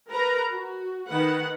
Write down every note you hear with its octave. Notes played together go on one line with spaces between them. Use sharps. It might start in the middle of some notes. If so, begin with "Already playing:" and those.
A#4 B4 A#5
F#4
D#3 B4 F#5